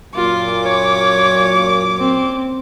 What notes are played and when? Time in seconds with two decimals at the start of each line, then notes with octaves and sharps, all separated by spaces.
0.15 F#2 A#2 F4 D6
0.65 C#5
1.98 C4